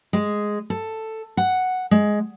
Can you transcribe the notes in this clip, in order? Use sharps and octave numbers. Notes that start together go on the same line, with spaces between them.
G#3
A4
F#5
G#3